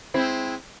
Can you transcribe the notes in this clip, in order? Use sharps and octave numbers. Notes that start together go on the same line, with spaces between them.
G#3 C4 E4